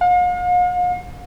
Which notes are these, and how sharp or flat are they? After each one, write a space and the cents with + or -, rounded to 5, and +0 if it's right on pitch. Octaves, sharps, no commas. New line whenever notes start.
F5 +45